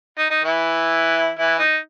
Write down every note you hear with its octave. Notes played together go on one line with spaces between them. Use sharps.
D#4
D#4
E3 E4
E3 E4
D#4